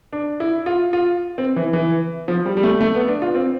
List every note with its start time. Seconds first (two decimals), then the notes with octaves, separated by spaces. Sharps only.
0.13 D4
0.40 E4
0.66 F4
0.93 F4
1.38 C4
1.56 E3
1.73 E3
2.28 F3
2.46 G3
2.57 G3
2.63 A3
2.81 A3
2.95 B3
3.08 D4
3.22 F4
3.35 C4